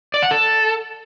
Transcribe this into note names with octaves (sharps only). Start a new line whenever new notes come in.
D5
F#5
A4